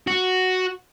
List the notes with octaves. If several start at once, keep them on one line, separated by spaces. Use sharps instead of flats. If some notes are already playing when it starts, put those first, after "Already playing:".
F#4